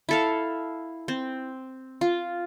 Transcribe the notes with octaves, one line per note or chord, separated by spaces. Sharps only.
E4 A4 F5
C4
F4